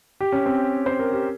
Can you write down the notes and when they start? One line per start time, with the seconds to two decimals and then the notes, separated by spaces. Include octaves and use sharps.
0.21 G4
0.32 C#4
0.46 C4
0.86 C5
0.99 A#4
1.12 G4